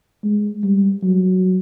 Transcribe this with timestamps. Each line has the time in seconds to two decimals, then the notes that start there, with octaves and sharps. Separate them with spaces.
0.24 G#3
0.63 G3
1.03 F#3